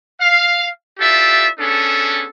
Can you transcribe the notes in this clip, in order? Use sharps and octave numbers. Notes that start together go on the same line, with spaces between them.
F5
E4 F4 G4 A4 D5 E5
B3 C#4 D4 G#4 A4